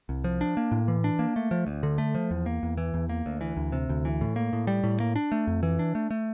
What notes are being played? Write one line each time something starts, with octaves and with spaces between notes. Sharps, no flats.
C2
F3
D4
A#3
A2
E3
D4
A#3
A3
F3
D2
D3
A3
F3
E2
A#3
E2
E3
E2
A#3
D2
E3
D2
C3
D2
E3
A2
A#3
A2
G3
A2
A#3
D4
A3
F2
E3
D4
A3
A3